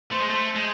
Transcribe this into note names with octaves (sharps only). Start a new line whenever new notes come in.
A3 C5
G#3
A3
G#3